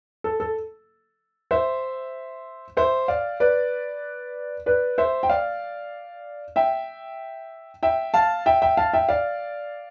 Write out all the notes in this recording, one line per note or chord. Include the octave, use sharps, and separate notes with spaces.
A4
A4
C5 E5
C5 E5
D5 F5
B4 D5
B4 D5
C5 E5
G5
D5 F5
E5 G5
E5 G5
F5 A5
E5 G5
E5 G5
F5 A5
E5 G5
D5 F5